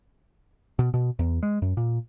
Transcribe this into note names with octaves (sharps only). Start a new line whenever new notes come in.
B2
B2
E2
G#3
F#2
A#2